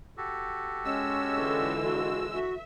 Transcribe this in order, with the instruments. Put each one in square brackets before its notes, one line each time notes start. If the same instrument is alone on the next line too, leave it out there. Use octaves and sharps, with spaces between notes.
[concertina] F#4 G4 A4
[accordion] G#3 E6 [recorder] C#4
[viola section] D3 E3 F4
[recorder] F#4
[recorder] F#4 [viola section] E5